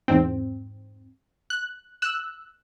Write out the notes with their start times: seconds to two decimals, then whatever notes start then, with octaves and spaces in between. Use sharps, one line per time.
0.08 E2 G#2 C4
1.50 F#6
2.02 E6 F#6